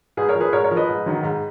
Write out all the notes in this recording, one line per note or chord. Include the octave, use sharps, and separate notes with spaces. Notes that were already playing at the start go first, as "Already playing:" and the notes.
G#2 G#4 B4
A#4 C#5
F3
G#4 B4
G#2 A#4 C#5
A#4 C#5
F3
B4 D#5
G#2
D#3 F#3
G#2